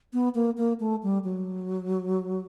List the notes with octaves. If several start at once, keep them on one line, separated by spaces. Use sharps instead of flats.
B3
A#3
A#3
A3
G3
F#3